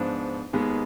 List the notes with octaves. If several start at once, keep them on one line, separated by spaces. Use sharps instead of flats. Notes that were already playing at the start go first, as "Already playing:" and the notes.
Already playing: G#2 F3 B3 D4
D#2 D#3 G#3 B3